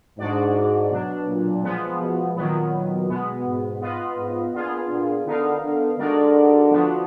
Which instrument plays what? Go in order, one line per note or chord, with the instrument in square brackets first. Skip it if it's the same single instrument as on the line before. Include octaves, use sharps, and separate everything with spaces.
[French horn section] G#2 [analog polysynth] G#3 D4 F#4 D5
[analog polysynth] B2 F#3 D4
[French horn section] A#2
[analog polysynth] F3 G#3 B3
[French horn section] B2
[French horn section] A#2 [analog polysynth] D#3 F#3 B3
[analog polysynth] B2 G#3 B3
[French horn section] G#2
[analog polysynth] B3 F4 B4 D#5
[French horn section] G#2
[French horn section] A#2 [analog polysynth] B3 D4 F4 G#4
[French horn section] A#2
[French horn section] D3 [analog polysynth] B3 D#4 A#4 F5
[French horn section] D3
[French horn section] D3 [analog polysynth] G#3 D#4 F#4 A#4 D5
[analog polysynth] F3 B3 D4 F#4